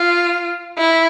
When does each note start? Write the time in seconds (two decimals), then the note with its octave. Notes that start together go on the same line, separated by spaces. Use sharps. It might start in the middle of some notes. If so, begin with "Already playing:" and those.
Already playing: F4
0.78 E4